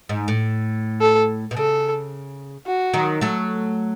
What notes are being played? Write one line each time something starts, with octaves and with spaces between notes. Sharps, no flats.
G#2
A2
A4
B2
C#3 A4
F#4
D#3 F#3
F#3 A3